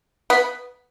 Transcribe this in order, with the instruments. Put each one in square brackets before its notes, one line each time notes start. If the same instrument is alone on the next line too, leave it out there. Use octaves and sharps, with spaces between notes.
[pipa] B3